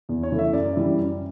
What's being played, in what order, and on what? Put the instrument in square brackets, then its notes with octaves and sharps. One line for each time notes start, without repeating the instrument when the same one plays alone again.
[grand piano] E2
C#5
C#3 E3 A3
E5
F#2 D5
C#3 E3 G3
F#2